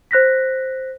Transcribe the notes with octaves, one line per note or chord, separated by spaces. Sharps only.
C5 F#6 A#6 B6